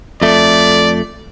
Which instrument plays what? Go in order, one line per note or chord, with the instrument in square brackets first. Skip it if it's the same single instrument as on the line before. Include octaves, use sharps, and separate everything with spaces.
[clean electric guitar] F2 A3 [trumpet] D5